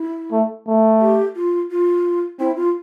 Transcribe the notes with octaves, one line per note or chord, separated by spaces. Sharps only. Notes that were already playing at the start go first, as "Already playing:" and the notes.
Already playing: E4
A3
A3
G4
F4
F4
C4 E4
F4